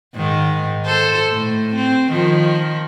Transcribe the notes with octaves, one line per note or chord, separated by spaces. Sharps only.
G#2 D#3
A4 C5
A2
C4
D#3 F3